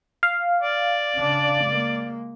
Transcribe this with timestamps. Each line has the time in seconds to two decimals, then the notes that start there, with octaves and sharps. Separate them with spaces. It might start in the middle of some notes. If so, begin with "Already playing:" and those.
0.23 F5
0.62 D5
1.16 C#3 D4
1.65 G#3 A#3